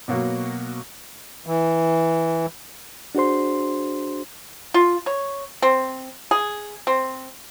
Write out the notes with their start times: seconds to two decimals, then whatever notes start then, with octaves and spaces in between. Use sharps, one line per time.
0.08 B2 F#3 A#3 F#4
1.46 E3
3.15 D4 F#4 G#4 C5 C6
4.74 F4
5.06 C#5
5.62 C4
6.31 G#4
6.87 C4